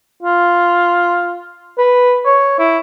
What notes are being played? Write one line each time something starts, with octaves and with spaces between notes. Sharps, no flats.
F4
B4
C#5
E4